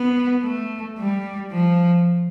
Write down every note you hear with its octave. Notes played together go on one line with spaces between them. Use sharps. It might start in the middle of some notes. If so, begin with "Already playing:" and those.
Already playing: B3
A3
G3
F3